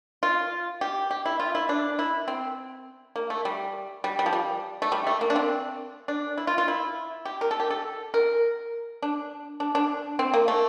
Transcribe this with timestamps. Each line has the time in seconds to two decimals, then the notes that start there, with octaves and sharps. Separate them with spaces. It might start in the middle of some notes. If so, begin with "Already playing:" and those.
0.23 F4
0.81 G4
1.11 G4
1.25 E4
1.40 F4
1.55 E4
1.69 D4
1.99 E4
2.28 C4
3.16 A#3
3.30 A3
3.45 G3
4.04 G3
4.19 G3
4.26 F3
4.33 G3
4.82 A3
4.92 G3
5.07 A3
5.21 A#3
5.30 D4
5.36 C4
6.08 D4
6.38 E4
6.47 F4
6.58 F4
6.68 E4
7.25 G4
7.41 A#4
7.51 A4
7.60 G4
7.70 A4
8.14 A#4
9.02 D4
9.60 D4
9.75 D4
10.19 C4
10.34 A#3
10.48 A3